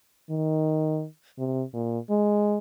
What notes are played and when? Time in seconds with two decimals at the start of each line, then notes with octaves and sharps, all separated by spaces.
0.30 D#3
1.38 C3
1.74 A#2
2.10 G#3